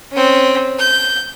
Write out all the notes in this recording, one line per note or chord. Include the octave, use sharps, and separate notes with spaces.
C4 C#4
G6